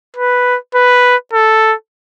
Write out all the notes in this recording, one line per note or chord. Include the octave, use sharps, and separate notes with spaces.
B4
B4
A4